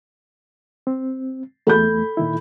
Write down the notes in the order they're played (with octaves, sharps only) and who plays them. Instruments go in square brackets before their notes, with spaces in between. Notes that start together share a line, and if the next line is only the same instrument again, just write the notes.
[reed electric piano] C4
[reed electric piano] E2 A3 [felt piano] A4 B5 G6
[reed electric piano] A#2 D#3 E4